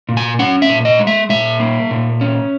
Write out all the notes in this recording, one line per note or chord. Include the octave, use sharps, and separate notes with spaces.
A#2
G#5
C#4 F#5
E5
A#2
D#5
G#3
E5
A#2 E5
A#3
A#2
C#4